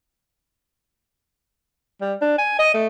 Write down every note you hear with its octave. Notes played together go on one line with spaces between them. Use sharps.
G3
D4
G#5
D#5
A3